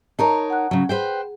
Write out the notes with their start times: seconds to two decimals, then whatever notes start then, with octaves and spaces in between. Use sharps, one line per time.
0.19 D#4 A#4 C#5 A5 A#5
0.50 F#5 F#6
0.71 C#3 F#3
0.89 G#4 B4 C5 G5